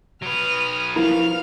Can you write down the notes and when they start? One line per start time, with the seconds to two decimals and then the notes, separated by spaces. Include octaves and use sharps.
0.23 F#3 B4 D#6 F6
0.96 F3 B3 E4 A#4 F5 F6